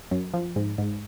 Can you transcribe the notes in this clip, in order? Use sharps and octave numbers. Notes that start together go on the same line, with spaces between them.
F#2
F3
G#2
G#2